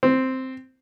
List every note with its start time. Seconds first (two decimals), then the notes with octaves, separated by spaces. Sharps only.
0.03 C4